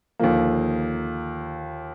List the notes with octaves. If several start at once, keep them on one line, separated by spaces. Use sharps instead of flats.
D#2 D3 F3 A#3